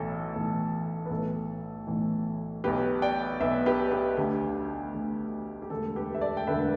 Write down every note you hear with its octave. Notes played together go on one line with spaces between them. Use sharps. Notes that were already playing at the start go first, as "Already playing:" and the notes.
Already playing: B1 A2 E3 A4
B1 A2 E3
B4
B1 A2 E3 A4
B1 A2 E3
B1 B2 G4 B4
D5 G5
B1 B2 B4 E5
G4 B4
G4 B4
D2 D3 G4
D2 D3
G4
E1 D2 D3 A4
G4 B4
E5
A4 D5
G5
E1 D2 D3 B4 E5